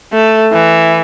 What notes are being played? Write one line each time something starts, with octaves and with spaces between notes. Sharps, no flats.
A3
E3